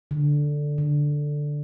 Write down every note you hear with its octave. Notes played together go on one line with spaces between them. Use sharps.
D3
D3